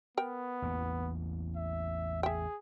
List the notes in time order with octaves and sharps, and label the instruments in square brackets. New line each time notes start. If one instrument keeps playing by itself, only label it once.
[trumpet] B3 [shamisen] A#4 G5
[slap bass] A1 E2 A#3
[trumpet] E5
[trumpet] G#4 [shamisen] E5 G5